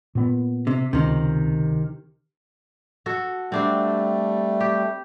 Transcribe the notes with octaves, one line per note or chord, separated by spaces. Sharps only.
A#2 B3
C3
C#2 C3 D#3
F#4 A4
G3 A3 C4 D4 C5
G4